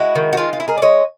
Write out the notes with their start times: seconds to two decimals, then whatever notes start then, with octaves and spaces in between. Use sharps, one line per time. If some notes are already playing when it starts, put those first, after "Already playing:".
Already playing: G#3 E4 F#4
0.15 D#3
0.33 F#4
0.37 G#3 F4
0.53 F4
0.60 E4
0.68 G#4 A#4
0.78 D5
0.82 G#3 C#5 D#5